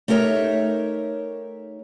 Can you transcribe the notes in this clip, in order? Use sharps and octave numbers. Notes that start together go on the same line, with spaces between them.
A3 D#4 G4 A#4 C#5 E5